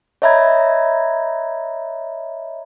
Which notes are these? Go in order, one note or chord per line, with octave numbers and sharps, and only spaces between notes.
C#5 D#5 E5 A#5 B5 G#6